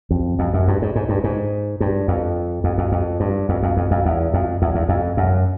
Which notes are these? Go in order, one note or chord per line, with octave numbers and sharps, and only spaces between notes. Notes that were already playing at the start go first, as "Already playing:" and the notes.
F2
F2
F#2
G2
G#2
G#2
G2
G#2
G2
F2
F2
F2
F2
G2
F2
F2
F2
F2
E2
F2
E2
E2
F2
F#2